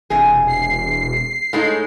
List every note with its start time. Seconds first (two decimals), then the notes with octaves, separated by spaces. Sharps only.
0.10 E1 C3 G#4
0.47 C7
1.53 A2 G#3 D#4